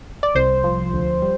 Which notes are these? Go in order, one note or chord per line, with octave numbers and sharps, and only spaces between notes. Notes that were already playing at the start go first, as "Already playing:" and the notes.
D5
C2 C5
F3
D2
G3